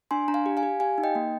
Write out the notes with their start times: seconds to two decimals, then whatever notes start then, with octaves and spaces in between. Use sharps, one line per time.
0.11 D4 G#5 C6
0.28 D4 A#5
0.34 F5 G#5
0.46 G4
0.57 F5 G#5
0.63 G4
0.80 G4 F5 G#5
0.98 D#4
1.04 D#5 G5
1.15 A#3